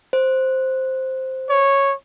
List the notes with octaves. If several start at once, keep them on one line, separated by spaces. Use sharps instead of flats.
C5
C#5